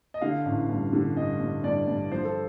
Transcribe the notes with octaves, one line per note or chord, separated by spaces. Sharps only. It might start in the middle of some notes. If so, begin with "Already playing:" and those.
D#5
D3 F5
A1
G2
D3
G2 D#5
G2
G2 D5
G2
F3 C5
A4